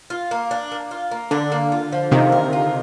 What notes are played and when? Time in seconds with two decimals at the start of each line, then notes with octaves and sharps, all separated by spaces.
0.10 F4
0.31 A#3
0.51 D4
0.72 A#3
0.91 F4
1.11 A#3
1.31 D3 D4
1.52 A#3
1.72 F4
1.93 F3
2.11 C3 D#3 A#3
2.32 A#4
2.53 F4